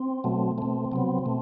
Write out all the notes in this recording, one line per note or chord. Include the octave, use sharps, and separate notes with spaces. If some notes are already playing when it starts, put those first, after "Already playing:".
Already playing: C4
B2 F#3 A3
B2 A3 C4
C3 F#3 B3
B2 A3